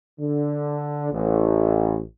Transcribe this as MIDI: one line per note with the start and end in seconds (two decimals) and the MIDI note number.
0.20 1.09 50
1.12 2.00 33